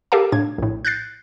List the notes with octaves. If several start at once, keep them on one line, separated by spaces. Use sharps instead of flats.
G4 A4 A#4 F5 A5
A2 D4 G#6
A#1 A2
F#6 G6 A6 C7